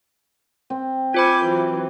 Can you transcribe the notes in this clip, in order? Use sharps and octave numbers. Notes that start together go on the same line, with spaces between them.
C4
F4 C5 G#5 B5 D6 G6
E3 F#3